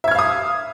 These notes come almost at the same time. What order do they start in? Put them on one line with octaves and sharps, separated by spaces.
E5 G#6 F6 F5 D#6